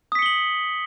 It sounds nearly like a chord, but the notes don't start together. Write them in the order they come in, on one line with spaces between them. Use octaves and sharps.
D#6 B6 C#7 G7 F#7